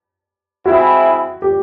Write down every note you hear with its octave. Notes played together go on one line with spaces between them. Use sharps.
G#3 C4 E4 F#4
G4